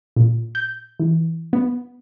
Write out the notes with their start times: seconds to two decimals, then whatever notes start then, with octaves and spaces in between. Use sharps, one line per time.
0.16 A#2
0.55 G6
1.00 E3
1.53 B3